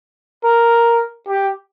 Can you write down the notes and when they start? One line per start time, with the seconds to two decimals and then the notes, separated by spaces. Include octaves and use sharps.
0.44 A#4
1.28 G4